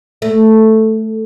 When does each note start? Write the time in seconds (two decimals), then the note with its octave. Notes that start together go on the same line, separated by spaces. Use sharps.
0.22 A3